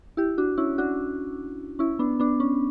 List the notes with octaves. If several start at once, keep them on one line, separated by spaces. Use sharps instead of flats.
E4 G4
D4 F#4
C#4 E4
D4 F#4
C#4 E4
B3 D4
B3 D4
C#4